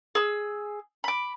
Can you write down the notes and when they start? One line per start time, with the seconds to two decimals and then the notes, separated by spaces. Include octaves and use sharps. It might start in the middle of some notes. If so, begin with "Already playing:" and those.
0.15 G#4 E6
1.04 B5 D6